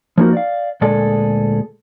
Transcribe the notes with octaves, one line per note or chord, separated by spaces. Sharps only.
F3 A#3 D#4 F#4 A#4
D5 F5
D2 A#2 G#3 G#4 A4 D5